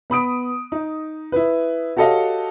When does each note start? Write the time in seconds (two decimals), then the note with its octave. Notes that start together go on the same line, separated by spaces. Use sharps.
0.10 B3 B5 D#6 D7
0.72 D#4
1.32 E4 B4
1.97 F#4 G4 A4 C#5 D#5 F5